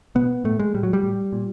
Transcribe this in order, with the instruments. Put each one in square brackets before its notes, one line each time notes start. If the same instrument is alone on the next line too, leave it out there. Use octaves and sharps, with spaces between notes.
[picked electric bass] B2 B3
A2 A3
G#3
A2 G3
F#3
G3
A2
A#2